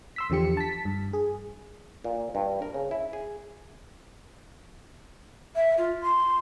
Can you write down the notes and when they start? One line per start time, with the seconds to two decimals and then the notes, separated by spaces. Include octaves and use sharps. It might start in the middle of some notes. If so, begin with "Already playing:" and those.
0.16 C6 E6 B6
0.30 E2 D3 F3 G4 C#7
0.57 A5 B6
0.85 G2
1.13 G#4
2.04 A#2
2.35 G2
2.62 A#4
2.74 C#3
2.91 E4
3.13 G#4
5.55 E5
5.77 F4
6.02 C6